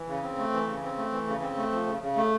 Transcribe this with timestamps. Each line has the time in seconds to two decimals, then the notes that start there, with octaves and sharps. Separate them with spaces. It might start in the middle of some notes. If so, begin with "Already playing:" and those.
Already playing: E3
0.08 C#3
0.23 C4
0.38 A3
0.53 E3
0.68 C#3
0.83 C4
0.98 A3
1.12 E3
1.27 C#3
1.42 C4
1.57 A3
1.72 F3
1.87 C#3
2.02 C#3
2.16 A3